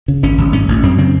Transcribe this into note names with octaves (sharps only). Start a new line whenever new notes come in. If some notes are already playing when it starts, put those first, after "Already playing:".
C#3
G#1 C#4
G#1
G#2 C#4
A1
F#2 C4
C#3 C4